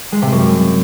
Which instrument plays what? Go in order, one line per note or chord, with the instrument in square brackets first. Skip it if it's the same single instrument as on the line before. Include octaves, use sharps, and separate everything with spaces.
[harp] G#3
C3
F#2